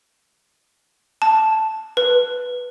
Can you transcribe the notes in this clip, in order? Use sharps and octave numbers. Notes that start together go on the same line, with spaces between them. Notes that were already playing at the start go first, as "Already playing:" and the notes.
A5
B4